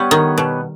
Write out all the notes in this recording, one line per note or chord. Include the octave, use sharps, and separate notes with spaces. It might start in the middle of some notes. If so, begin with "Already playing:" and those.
Already playing: G3 B3 G4 C#5
D#3
B2